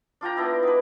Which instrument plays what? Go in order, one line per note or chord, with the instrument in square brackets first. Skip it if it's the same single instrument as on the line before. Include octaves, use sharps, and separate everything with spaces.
[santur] D4 F4 G5 A#5
B3 D4 E4
D#4 B4